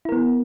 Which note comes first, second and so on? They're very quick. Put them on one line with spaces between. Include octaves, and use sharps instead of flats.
E4 A#4 B3